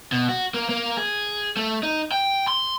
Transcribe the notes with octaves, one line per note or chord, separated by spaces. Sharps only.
B2
F#4
A#3
A#3
G#4
A3
D#4
G5
C6